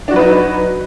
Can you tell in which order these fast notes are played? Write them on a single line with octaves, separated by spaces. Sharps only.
D4 F#4 F#3 B4 D#4